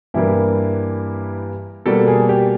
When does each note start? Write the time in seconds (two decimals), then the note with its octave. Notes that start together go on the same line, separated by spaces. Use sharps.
0.14 G2 E3 G3 A#3 E4
1.86 B2 G3 A#3 A4
2.08 G#4
2.29 G4